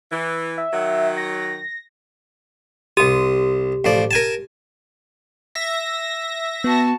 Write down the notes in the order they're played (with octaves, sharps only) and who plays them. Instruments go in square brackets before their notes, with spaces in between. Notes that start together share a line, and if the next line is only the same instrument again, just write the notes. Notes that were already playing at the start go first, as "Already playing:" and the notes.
[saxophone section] E3
[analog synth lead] E5
[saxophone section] D#3 F#3
[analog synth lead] A#6
[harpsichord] C2 D#6 [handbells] G4
[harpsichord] A1 F3 D5
A#4 G#5 A5
[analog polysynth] E5 A#6
[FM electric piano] B3 [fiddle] F#4 A5